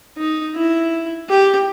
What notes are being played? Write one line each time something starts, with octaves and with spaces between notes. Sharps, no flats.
D#4
E4
G4